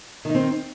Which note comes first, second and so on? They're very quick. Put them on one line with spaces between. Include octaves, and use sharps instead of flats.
D#3 D#4 C4